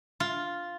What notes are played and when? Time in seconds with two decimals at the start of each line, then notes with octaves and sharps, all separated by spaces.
0.20 F4